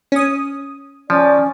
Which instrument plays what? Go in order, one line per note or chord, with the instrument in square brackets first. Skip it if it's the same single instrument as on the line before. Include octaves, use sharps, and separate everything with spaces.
[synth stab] C#4 D#6
[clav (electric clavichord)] F3 [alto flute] C#4 [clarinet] D5